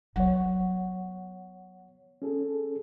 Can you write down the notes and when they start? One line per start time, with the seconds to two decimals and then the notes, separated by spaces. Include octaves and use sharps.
0.16 F#3 B3 C#5 F#5
2.22 C#4 G#4 A4